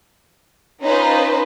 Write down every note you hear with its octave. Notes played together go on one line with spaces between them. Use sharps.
C#4 D#4 F4 B4 C5